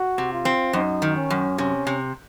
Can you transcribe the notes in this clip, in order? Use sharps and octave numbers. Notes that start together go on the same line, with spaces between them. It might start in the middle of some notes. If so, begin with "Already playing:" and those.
Already playing: F#4
C3
F4
C4
F#2 D#4
D#3
C#4
F#2
C3 C#4
C3